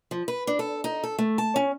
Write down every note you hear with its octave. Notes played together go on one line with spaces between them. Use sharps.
F3
B4
D4
A4
D#4
A4
A3
A5
C#4